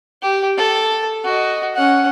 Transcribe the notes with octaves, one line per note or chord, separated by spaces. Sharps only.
G4
A4
F#4 D#5
C#4 F#5